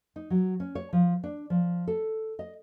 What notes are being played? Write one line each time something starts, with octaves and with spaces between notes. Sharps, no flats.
D#4
F#3
C#4
C#5
F3
D4
F3
A4
D#5